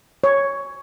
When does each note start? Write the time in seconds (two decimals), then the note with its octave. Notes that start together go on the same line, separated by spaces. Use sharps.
0.24 C#5